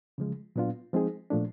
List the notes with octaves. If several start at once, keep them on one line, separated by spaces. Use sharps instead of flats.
C#3 F3 G#3
A#2 F#3 B3 D4 F4
F3 G#3 C4 D#4 G#4
A#2 F3 A3 D4